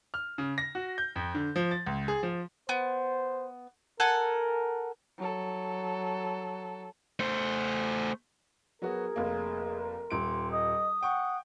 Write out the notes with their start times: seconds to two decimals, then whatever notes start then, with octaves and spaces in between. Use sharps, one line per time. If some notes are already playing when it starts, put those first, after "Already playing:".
0.14 F6
0.38 C#3
0.58 A#6
0.75 F#4
0.98 G6
1.16 F2
1.34 D3
1.56 F3
1.71 A6
1.86 C#2
2.08 G#4
2.23 F3
2.69 B3 C5
4.00 A4 A#4 F#5 G#5
5.18 F#3 A4
7.20 A3 C5
8.82 F#3 B3 F#4 G#4 A#4
9.16 F1 A#3
10.11 D#1 C6 D7
10.52 D#5 D#6
11.03 F#5 G5 C#6